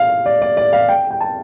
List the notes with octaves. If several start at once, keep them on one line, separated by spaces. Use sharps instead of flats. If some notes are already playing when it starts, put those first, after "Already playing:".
Already playing: F5
D5
D5
D5
F5
G5
G5
A5